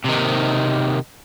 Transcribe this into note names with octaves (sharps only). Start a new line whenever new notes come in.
C3 D#3